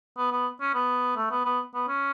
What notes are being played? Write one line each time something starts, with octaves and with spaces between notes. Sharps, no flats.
B3
B3
C#4
B3
A3
B3
B3
B3
C#4